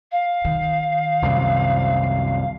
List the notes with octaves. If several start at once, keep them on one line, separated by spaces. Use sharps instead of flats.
F5
D#3
C2 F#2 C3